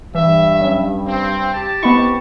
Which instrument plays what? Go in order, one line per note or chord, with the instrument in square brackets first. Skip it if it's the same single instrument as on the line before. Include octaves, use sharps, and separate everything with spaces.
[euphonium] G2 [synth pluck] E3 [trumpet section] E5
[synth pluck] F#3 C#4
[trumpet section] C4
G4 A5
[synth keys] B3 C#6 [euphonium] C4 [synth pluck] E4 D#5 B5